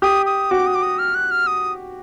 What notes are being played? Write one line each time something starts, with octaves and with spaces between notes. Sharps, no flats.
G4 D#6
D#6
F#4 D6
D#6
D6
D#6
F6
F#6
F6
D#6